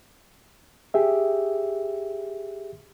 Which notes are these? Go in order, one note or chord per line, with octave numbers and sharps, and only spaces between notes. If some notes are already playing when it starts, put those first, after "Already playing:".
G4 G#4 E5